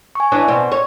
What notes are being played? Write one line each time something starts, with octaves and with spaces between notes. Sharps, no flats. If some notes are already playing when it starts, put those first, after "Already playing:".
G#5 C#6
E3 C#4 D4
B2 C4
C#5